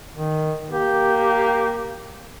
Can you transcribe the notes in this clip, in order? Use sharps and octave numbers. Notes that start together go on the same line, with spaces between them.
D#3
A#3 G4